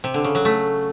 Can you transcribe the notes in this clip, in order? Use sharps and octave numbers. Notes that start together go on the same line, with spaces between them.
C3
D3
C#3
F#3
A3